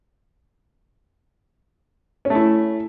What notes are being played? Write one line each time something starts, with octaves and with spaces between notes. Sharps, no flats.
A3 C#4 E4